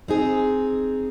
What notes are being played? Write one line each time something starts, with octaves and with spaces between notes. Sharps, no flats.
C4 D#4 G#4